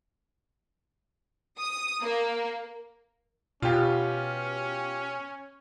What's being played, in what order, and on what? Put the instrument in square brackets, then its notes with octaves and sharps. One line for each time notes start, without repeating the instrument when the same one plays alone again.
[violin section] D#6
A#3
[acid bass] B2 [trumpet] C#4 [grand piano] F4 G4